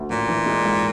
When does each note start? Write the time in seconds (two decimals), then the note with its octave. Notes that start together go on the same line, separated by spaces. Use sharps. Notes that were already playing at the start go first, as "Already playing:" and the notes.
Already playing: D2
0.09 A1 A#2
0.28 E3
0.46 G#3
0.65 G#2